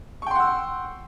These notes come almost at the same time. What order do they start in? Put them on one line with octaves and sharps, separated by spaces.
C#6 G5 C6 F#5 E6